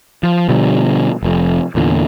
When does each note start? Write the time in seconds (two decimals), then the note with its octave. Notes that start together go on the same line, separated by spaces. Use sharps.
0.23 F3
0.49 B2 D3 F3 G3
1.23 F1 F2
1.75 E2 A#2 D3